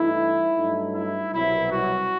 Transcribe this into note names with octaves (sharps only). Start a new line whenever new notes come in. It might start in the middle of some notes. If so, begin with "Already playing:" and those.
Already playing: G2 E3 A3 D#4 E4
G2 F#3 A3 D#4
E4
C2 B2 F#3 E4
F#4